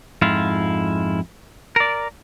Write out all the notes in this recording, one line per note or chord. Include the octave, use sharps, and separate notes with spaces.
F2 G#2 E4 F4
A#4 D5